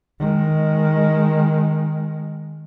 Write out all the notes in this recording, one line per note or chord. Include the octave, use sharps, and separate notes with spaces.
D#3 G#3